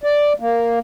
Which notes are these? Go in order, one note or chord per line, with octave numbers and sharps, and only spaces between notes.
D5
A#3